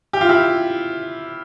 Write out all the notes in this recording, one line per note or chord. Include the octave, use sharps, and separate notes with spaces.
G4
F4
E4 G4